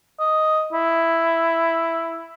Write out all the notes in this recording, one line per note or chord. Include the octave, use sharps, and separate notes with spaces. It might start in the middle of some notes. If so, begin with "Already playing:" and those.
D#5
E4